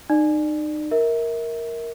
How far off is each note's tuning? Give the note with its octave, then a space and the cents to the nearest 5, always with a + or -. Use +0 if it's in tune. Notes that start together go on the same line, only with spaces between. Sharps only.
D#4 -30 D5 +20
A#4 +0 E5 -30